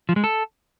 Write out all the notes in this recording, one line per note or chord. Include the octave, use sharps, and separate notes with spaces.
F3
G#3
A4